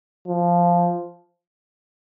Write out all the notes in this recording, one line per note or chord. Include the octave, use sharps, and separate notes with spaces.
F3